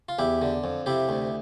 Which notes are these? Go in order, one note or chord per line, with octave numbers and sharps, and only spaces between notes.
F4
E2 E4 G4
D3
F2
C3 E4 G4
D2